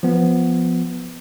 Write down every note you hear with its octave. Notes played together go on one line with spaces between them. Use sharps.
F3 B3